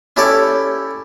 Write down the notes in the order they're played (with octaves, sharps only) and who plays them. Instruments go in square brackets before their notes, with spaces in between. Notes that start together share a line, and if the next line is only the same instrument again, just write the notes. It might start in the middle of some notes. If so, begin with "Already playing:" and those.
[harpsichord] C#4 E4 G4 A4 C#5 D5